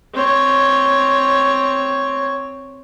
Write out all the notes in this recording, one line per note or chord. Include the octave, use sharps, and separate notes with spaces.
C4 C#5